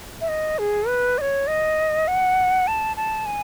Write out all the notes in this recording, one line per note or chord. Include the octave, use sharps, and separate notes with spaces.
E5
D#5
G#4
B4
D#5
C#5
D#5
F#5
A5
A5
G#5